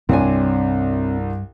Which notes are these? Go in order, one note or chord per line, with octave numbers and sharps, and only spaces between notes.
C2 G2 G3 C4 D4 C#5 G#5